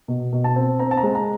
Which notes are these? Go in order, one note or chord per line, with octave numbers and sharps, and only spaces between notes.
B2
B2
A5
C4
C4 A#5
A5
A#5
G#3
A#5